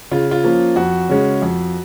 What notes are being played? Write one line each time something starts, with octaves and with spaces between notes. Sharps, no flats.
C#3 F4
F4
F3 A#3 C#4
F2 F#4
C#3 G#3 C#4
F2